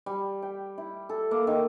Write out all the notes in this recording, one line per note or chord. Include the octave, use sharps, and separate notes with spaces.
G3
G5
E4
A4
A#3
D#3